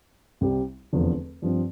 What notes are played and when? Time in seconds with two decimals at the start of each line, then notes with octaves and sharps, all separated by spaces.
0.41 C2 C3 G3 C4 G4
0.93 F1 E2 D3 F3
1.42 G2 F3 C4